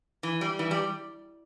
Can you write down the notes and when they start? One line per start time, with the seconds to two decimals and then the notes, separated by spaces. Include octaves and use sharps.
0.23 E3
0.41 G3
0.59 E3
0.71 G3